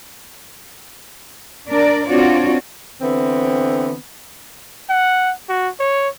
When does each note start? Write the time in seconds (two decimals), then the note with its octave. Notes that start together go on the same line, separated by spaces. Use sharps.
1.68 D4 A#4 D5
2.08 C4 D4 F4 F#4 C#5 D5
3.01 D3 E3 B3 C4
4.89 F#5
5.49 F#4
5.79 C#5